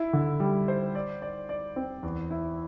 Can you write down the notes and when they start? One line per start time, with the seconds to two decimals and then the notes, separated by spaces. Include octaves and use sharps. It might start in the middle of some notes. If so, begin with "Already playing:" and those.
Already playing: E4
0.13 D3
0.40 G3
0.68 C5
0.95 D5
1.22 D5
1.49 D5
1.76 C4
2.03 E2
2.30 E4